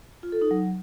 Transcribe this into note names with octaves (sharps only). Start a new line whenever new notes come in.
F4
A4
D#4
F#3